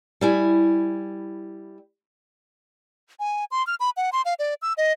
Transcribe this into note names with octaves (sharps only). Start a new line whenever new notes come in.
G3 E4 G#5
G#5
C6
F6
B5
F#5
C6
F5
D5
E6
D#5